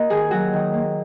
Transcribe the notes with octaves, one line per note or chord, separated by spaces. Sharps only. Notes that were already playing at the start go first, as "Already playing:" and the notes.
Already playing: A#3 F#4 A#4 D#5
D#3 G#4
F#3 F#4
D#3
A#3